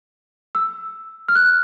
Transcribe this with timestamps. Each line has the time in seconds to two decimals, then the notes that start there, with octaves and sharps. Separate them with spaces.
0.55 E6
1.28 F6
1.35 F#6